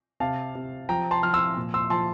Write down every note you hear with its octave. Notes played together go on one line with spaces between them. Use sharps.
C3 F5 A5
C3
F3 G5 A#5
A5 C6
F3 F6
C6 E6
A#2
C6 E6
F3 A5 C6